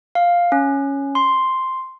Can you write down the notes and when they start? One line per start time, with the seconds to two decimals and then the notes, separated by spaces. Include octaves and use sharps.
0.15 F5
0.52 C#4
1.15 C6